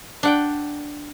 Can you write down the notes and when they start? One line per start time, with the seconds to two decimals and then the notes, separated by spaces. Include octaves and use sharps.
0.23 D4 F#5 G5